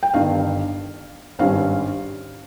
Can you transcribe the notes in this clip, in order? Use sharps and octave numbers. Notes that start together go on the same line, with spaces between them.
G5
G1 G2 D#3 F5
G#1 G2 G3 C#4 F5